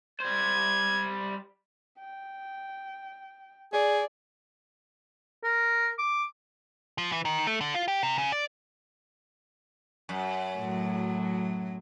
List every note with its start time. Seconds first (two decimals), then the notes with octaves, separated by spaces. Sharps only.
0.20 G3 C5 G#6
1.99 G5
3.73 G#4 D5
5.44 A#4
5.99 D6
6.98 F3
7.12 E3
7.25 D#3
7.47 A3
7.61 D3
7.74 F4
7.88 G4
8.03 C3
8.18 C#3
8.32 D5
10.09 F#2
10.57 A2 F#3